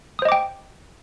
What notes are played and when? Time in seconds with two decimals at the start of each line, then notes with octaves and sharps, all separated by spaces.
0.19 D#6
0.22 C5
0.25 D#5
0.29 D6
0.32 G5